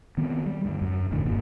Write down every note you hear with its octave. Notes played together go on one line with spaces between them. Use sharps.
D#3 B3 C4
G3
D2 G2
F#2
F1 D#2 A2 D3
G1 G2 A#2 D#3